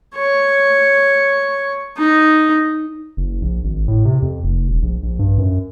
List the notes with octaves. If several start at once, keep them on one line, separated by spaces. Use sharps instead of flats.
C#5
D#4
F#1
A#1
G#1
A2
C3
F2
F1
D#1
A#1
A#1
G2
F#2